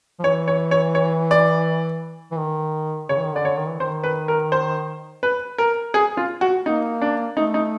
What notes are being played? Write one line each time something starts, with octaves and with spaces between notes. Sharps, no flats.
F3
E3 C#5
C#5
C#5
C#5
D5
E3
D#3
C#3 C#5
E3
D#3
D3 D5
C#5
D#3
E3
D#3 C5
B4
A#4
C5
B4
A#4
G#4
F4
F#4
A#3 D#4
D4
A3 D#4
D#4